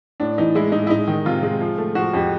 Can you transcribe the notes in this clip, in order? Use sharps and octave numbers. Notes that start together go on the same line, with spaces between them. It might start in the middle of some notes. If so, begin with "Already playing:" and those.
A2 D4
E3 D#4
G#3 E4
G#3 D#4
E4
G#3 D#4
D#3
C3 F4
G#3
F3
A3
F3 F#4
F2 G4